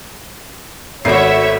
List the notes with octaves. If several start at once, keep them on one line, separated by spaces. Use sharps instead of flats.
G#1 A3 B3 F#4 C#5 E5 C7